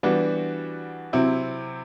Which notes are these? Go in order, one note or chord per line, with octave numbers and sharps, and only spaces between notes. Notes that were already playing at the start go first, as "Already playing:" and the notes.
E3 G3 B3 D4 F#4
C3 F#3 C4 E4